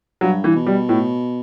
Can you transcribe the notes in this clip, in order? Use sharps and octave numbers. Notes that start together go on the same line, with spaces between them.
G2 F#3
E3
B2
G3
A2